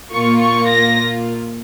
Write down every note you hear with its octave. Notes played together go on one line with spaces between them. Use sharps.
A#2 A#3 F4 C#6
C#6
A#6